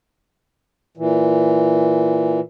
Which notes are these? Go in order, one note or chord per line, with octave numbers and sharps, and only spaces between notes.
A#2 E3